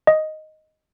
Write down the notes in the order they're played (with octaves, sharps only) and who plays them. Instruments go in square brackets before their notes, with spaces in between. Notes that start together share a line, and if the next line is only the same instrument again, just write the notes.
[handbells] D#5